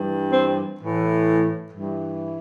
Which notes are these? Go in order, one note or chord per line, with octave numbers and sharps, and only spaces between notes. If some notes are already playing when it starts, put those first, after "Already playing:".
Already playing: G2 E3
C4
A2 E3
G2 E3